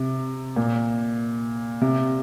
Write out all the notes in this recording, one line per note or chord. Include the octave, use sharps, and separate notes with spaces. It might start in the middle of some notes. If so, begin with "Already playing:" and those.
Already playing: C3
A#2
C3